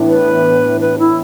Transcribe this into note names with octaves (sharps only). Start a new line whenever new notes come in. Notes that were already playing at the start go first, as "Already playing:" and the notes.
Already playing: A2 E3 B3 D4
B4
B4
E4